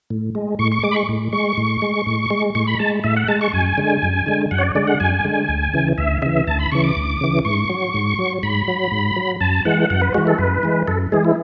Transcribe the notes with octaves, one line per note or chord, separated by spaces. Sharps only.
A2
G#3
A2 C#6
C#6
G#3 D6
B5
C#6
A2
G#3 C#6
A2
G#3
A2
G#3
A2 C#6
B5
G#3 A5
A2 E5
F#5
G#3 A5
C#6
F#2 G#5
D3 G#3
F#2
D3 G#3
F#2 F#5
C#5
D5
D3 G#3 D5
F#5
F#2 G#5
D3 G#3
D2
C#3 E3
D2 E5
C#3 E3 E5
D2 A5
B5
C#3 E3 C#6
D6
D2
C#3 E3
G#2 C#6
F#3
G#2
F#3
G#2 B5
F#3
G#2
F#3
F#2 A5
E3 G#3 F#5
F#2 F#5
B4
E3 G#3 F#4
A4
F#2 B4
E3 G#3
F#2 A4
E3 G#3 G#4
E4